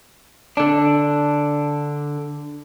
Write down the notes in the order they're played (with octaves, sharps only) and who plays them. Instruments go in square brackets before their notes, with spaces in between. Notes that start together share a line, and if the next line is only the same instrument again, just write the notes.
[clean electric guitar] D3 D4